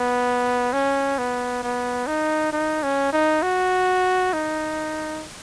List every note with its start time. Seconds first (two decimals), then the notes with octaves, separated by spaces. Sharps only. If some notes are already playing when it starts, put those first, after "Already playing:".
Already playing: B3
0.73 C#4
1.18 B3
1.63 B3
2.07 D#4
2.52 D#4
2.83 C#4
3.13 D#4
3.43 F#4
4.33 D#4